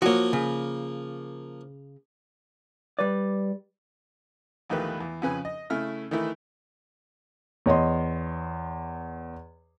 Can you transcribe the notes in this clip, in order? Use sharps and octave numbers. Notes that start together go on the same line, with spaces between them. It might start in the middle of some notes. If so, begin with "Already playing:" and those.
F3 A#3 F#4 C#5
C#3
G3 B4 D5
A#1 E2 D#3 A3 G4 B4
E2
F2 C#3 B4 G#5
D#5
C#3 A3 E4 F6
D#3 E3 A3 E4 B4
E2 C#5 D#5 C6